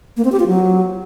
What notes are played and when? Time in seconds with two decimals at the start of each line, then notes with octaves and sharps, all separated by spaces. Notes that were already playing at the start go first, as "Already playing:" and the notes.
0.17 A#3
0.25 C4
0.32 G4
0.40 F4
0.47 F#3